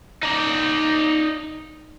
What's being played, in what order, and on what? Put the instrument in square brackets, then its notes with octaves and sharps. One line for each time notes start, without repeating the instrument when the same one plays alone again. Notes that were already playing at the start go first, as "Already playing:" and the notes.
[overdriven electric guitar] D#4 D5